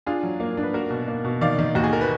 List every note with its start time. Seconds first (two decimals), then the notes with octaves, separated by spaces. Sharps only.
0.06 D4 F4 G#4
0.23 F#3
0.40 A#3
0.57 D4
0.63 B4
0.74 A#3 F#4 A#4
0.90 B2
1.08 A#3
1.24 B2
1.41 D#3 D5 F5
1.59 D#3
1.75 D#2 F#4
1.84 G#4
1.93 A#4
2.01 B4